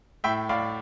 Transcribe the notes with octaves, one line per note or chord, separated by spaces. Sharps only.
A2 E5 G5
A2 D5 F5